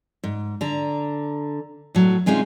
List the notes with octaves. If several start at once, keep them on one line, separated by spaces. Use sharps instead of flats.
G#2
D3 A#5
A2 F#3
C3 G#3 C#4 D#4 F4